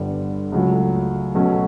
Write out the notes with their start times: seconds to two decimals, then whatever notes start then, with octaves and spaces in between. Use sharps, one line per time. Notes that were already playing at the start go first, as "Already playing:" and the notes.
Already playing: G1 G2 D3 G3 B3
0.52 C#2 C#3 F#3 A3
1.35 B2 F#3 A3 C#4